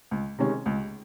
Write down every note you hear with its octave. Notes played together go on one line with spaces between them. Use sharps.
C#2
C3 D#3 G#3 C#4
C#2